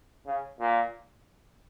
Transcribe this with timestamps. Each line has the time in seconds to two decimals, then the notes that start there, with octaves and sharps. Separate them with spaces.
0.26 C#3
0.59 A#2